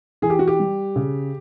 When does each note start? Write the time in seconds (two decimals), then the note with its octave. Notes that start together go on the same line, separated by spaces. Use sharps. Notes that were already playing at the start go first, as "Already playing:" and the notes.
0.22 E3 G#4
0.30 G4
0.39 F#4
0.48 G4
0.59 G3
0.96 C#3